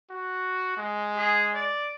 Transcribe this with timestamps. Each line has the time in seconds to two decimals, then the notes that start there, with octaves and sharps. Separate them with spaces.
0.10 F#4
0.77 G#3
1.17 G#4
1.54 D5